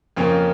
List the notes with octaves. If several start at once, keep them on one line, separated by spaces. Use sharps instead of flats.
F2 C#3 F3 A#3 C#4